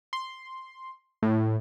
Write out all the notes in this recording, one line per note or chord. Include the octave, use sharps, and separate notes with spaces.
C6
A2